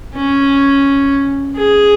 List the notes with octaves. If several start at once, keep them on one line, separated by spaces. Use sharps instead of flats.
C#4
G#4